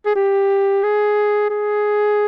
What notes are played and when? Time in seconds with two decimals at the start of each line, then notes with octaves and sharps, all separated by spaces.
0.06 G#4
0.15 G4
0.83 G#4
1.49 G#4